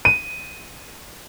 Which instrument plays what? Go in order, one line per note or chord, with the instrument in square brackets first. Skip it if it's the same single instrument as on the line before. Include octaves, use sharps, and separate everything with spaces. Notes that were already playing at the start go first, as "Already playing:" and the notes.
[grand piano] D#7